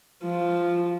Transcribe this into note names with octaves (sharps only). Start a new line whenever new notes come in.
F3